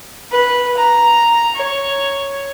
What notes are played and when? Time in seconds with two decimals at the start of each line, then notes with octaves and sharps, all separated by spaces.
0.32 B4
0.77 A#5
1.56 C#5